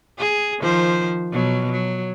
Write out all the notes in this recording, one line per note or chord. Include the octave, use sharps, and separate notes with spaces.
G#4
D#3 F3 C5
B2 F#3
F#3